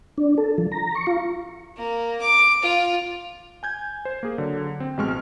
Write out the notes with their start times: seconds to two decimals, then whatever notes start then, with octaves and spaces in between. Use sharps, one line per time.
0.18 D4
0.38 A4
0.58 F3
0.72 A#5
0.95 C#6
1.07 F4
1.77 A#3
2.21 D6
2.62 F4
3.63 G#5 G6 G#6
4.05 C5
4.23 A#3 G#4
4.38 D3 F#3
4.80 C4
4.97 A1 B2 G#3 C#6 F6